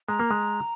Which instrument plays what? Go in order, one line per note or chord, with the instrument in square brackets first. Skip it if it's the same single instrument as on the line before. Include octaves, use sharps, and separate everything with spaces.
[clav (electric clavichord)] G#3 [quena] A#5
[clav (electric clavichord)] A#3
G#3